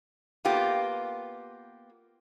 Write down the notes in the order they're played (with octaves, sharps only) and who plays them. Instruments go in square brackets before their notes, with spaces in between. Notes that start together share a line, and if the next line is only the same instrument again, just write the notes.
[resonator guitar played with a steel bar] A#3 B3 F4 G4